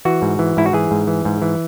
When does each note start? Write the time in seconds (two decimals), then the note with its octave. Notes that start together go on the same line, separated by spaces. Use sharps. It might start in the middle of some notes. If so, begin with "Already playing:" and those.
0.05 E3 F#4
0.22 G#2
0.39 E3
0.57 G#2 E4
0.66 F#4
0.73 E3 G#4
0.91 G#2
1.07 E3
1.25 G#2
1.42 E3